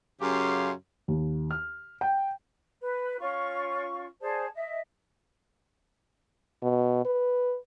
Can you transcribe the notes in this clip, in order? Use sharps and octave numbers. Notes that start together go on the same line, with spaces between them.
F#2 C#3 C#4 G4 F5 C6
D#2
F6
G5
B4
C#4 F4 C#6
G#4 C5 D5 A5
D#5 E5
B2
B4